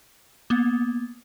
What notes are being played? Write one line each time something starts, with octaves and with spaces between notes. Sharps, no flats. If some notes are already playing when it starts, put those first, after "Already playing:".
A#3 B3